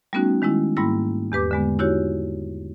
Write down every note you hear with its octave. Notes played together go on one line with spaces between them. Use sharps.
G3 A3 B3 C#4 D#4 F#4
D#3 G#3 C#4 E4
G#2 G3 A#3 E4 B5 A#6
E2 G4 B4 D6
D3 G#3 B3
D#4 E4 F#4 G4 C#5